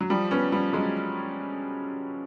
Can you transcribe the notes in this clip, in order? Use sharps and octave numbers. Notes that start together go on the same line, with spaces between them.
F#3
F3 G3
B3 C#4
F3 G3
F#3 G#3